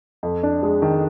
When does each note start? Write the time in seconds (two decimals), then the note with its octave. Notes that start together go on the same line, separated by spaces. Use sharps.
0.23 F2
0.43 D4
0.63 G#3
0.82 D#3